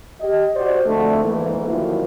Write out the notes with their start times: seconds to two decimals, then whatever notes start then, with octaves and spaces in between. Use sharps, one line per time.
0.21 G4 D#5
0.55 F#4 C5 D5
0.87 F2 G#2 D3 A3
1.24 G#2 E3 A#3
1.68 D3 D#3 F3 F#3 E4